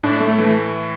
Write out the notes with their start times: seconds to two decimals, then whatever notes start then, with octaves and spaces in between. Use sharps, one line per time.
0.03 A2 D4
0.20 A3
0.38 E3 A3